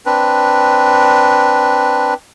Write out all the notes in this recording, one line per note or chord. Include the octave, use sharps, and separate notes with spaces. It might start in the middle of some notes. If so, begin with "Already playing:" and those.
C4 D4 B4